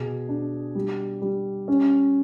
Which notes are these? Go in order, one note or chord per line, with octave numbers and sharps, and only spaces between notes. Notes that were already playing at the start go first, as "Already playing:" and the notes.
Already playing: B2 G#4
D4
G3
G3
C#4